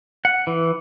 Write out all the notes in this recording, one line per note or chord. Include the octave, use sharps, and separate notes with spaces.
F#5
E3